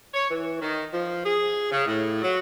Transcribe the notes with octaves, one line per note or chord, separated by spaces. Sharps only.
C#5
E3
D#3
F3
G#4
C#3
A2
F#3